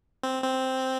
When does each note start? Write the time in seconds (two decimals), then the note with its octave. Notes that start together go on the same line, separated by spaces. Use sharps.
0.23 C4
0.43 C4